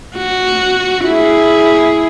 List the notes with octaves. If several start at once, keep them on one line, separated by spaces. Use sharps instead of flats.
F#4
E4 G#4